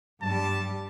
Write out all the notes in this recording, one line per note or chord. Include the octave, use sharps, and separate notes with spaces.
G2 G3 A5